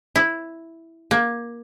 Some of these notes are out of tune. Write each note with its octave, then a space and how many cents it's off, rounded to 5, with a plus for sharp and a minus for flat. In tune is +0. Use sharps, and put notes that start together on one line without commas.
E4 +0
A#3 +15